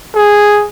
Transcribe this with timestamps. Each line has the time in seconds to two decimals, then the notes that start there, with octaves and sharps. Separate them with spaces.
0.15 G#4